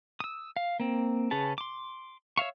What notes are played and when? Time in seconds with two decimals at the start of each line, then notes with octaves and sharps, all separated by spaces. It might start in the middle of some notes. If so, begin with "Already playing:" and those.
0.20 D#6 E6
0.57 F5
0.80 A#3 C4
1.31 C#3 C#4 G#4 B4 A5
1.58 C6 D6
2.37 C#5 E5 F5 C#6